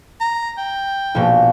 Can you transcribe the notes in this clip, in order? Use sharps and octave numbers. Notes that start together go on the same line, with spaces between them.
A#5
G5
A#1 B2